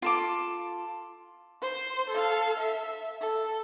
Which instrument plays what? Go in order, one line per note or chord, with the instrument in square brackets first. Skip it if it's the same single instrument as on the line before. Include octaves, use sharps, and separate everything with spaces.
[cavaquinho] F4 A4 D6
[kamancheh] C5
A4 F5
E5
A4